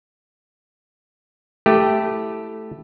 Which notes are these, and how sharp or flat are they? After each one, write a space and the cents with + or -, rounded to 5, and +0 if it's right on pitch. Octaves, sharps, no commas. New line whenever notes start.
A3 +0 E4 +0 G4 +0